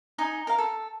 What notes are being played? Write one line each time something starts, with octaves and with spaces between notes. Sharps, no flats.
D#4 D#5 G#5
A#4 F5
A4